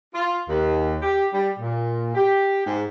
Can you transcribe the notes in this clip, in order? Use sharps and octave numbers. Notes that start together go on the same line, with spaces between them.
F4
D#2
G4
G3
A#2
G4
G#2